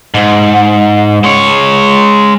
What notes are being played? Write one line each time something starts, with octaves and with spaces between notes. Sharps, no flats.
G#2
G#3 C#5